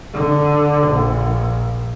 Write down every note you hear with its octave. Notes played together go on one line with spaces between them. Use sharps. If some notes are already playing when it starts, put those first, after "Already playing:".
D3
A#1